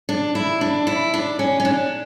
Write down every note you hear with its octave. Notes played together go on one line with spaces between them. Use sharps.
D4
E4
D4
E4
D4
C#4
C#4
D4